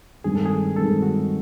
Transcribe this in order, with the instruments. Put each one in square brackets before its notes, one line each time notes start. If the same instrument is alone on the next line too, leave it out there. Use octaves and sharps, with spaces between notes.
[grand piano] G2 D#3 G#3 C4 [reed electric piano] G#4
[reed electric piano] A4
G#4
[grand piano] G2 D#3 G#3 C4 [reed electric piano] A4
[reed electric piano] F#4